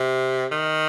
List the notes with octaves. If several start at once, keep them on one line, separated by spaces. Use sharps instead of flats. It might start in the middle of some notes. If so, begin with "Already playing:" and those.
Already playing: C3
D#3